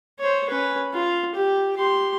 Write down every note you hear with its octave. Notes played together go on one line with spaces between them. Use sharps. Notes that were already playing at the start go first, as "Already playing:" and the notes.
C5 C#5
C#4 B4
F4
G4
G4 C6